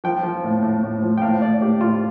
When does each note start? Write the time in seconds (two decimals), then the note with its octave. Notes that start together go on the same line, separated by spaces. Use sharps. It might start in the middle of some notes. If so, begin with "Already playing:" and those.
0.04 F3 G5
0.23 F3
0.44 A2
0.63 A2
0.83 A2
1.02 F3
1.17 G5
1.22 A2 F5
1.42 A2 D5
1.61 A2 G4
1.81 A2 F4